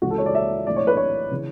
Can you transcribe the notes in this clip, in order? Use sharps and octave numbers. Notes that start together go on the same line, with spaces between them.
C#2 C#3 E3 F#4
A4
C#5
D5
E5
B1 A2 E3 D5
C#5
B4
C#5
C#3 E3